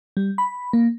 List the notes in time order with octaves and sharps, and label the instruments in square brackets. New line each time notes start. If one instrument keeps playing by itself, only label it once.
[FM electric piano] G3
B5
A#3